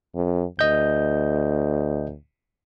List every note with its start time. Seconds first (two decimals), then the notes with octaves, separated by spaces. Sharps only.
0.15 F2
0.59 D2 D#5 G6